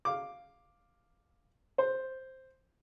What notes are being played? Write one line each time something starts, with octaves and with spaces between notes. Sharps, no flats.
F5 D6
C5